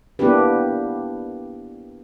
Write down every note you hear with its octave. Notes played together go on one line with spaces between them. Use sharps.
A#3 B3 D4 E4 G4 B4